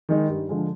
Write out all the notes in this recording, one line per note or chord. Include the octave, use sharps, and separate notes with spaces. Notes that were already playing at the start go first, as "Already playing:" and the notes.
D#3 G#3 D#4
G2
D3 F3 G#3